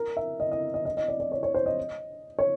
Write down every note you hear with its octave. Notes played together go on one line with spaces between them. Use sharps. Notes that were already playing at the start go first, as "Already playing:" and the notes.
Already playing: A#4
E5
D#5
D#5
D#5
D#5
D#5
D5
D5
C#5
C#5
C5
D#5
C#5